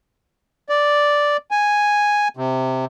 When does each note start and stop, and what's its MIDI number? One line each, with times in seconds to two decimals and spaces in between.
0.69 1.37 74
1.51 2.28 80
2.37 2.85 48